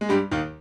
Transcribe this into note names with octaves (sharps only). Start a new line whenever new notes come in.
G#3
G2 G3
D#2 D#3